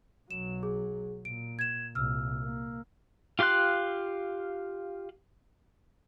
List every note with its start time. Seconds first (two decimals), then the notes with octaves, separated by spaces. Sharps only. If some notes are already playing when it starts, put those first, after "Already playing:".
0.31 B1 F#3 E7
0.63 G#4
1.25 A#2 D7
1.59 G#6 E7
1.95 C2 A#2 E6 F6
2.41 A#3
3.39 F4 G4 F5 C6 F#6